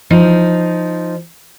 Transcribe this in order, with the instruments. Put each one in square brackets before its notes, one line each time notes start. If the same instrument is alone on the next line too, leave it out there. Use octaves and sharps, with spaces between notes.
[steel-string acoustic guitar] F3 D#4